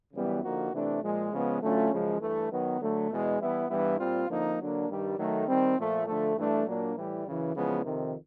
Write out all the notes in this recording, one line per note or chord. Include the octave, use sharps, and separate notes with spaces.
F#2 C#3 E3 G3 B3
D3 F3 A#3 D#4 F#4
C3 E3 A3 D4
A#2 F3 G#3
C#3 F3 G#3 B3
D3 F#3 A3 C#4 F4
F#2 C#3 F3 G#3
G2 E3 A3
D#3 F#3 B3
D3 F#3 A3
E2 B2 G#3
E3 G3 B3 E4
G2 E3 G3 B3 E4
A#2 G3 C4 F4
F2 D3 F3 A#3 D#4
D3 F#3 A#3 D4
G2 D#3 G3
D#3 F#3 A3
D#3 G3 C4
A#2 F3 A3
D3 F3 A3
G2 E3 A3 D4
A#2 F#3 A#3 D4
A2 E3 G3
F#2 C#3 E3
E2 C#3 F3 G#3 B3
F2 C3 D#3